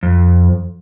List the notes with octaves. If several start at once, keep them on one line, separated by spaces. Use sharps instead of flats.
F2